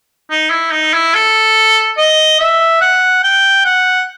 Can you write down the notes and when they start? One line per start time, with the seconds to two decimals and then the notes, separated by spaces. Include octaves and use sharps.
0.31 D#4
0.51 E4
0.72 D#4
0.94 E4
1.14 A4
1.98 D#5
2.40 E5
2.81 F#5
3.24 G5
3.65 F#5